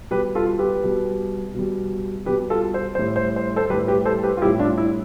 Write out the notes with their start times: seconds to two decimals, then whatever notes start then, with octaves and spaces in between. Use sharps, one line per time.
0.11 B2 G3 G4 B4
0.35 F4 A4
0.59 G4 B4
0.83 B2 G3
1.54 B2 G3
2.26 B2 G3 G4 B4
2.50 F4 A4
2.74 C5
2.95 A2 G3 C5
3.16 C5
3.36 C5
3.56 A4 C5
3.70 G3 G4 B4
3.73 A2
3.88 G4 B4
4.05 A4 C5
4.23 G4 B4
4.37 F4
4.42 G3 E4 G4
4.46 A2
4.59 D4 F4
4.78 E4